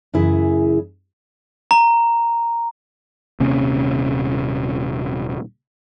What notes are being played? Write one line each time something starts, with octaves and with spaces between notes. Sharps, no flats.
F#2 C#3 E3 E4 G#4 E5
A#5
D#1 C3 A#3 C#4